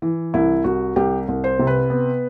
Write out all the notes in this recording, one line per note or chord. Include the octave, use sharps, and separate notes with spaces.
E3
C2 E4
C2 F#4
C2 G4
C2
C5
C3
B4
B3